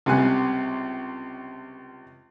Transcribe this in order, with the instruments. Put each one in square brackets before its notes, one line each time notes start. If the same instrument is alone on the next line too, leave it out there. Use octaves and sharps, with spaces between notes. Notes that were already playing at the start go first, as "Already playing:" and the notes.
[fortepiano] C#2 C3 G3 G#5 F#6